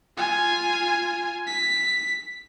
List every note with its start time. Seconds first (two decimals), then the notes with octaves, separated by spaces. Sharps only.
0.17 F4 G#5
1.47 B6